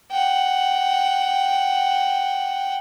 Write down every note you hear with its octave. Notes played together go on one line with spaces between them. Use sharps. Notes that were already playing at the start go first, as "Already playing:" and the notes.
F#5 G5